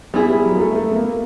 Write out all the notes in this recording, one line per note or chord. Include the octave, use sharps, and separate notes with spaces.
G3 B3 E4 G#4
G3
F#3
A#3
A3
A3
B3
A#3